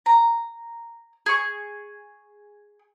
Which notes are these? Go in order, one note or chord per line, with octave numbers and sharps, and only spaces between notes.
A#5
G#4 C#6